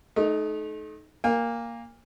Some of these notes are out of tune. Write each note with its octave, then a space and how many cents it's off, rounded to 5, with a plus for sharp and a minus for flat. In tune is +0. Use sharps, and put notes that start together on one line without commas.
A3 -35 D#4 +0
A#3 +0 G#5 -40